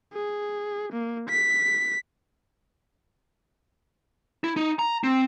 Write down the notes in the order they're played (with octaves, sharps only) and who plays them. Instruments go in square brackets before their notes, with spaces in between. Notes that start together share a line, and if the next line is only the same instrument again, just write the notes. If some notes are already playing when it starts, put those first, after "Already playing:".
[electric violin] G#4
A#3
B6
[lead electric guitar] E4
D#4
A#5
C4